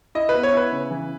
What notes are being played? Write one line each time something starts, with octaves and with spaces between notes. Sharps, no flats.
E4 D#5
B4
B3
C#5
E4 B4
C#3
E3